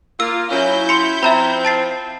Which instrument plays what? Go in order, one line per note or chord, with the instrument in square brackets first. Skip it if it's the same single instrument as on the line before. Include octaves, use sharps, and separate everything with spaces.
[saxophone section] A#3 F4 [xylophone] E6
[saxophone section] F#3 C#4 [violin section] E4 G6
[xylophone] C6 C#7
[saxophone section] F3 C4 [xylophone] E5 A#5 B5
[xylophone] A5 A6 C7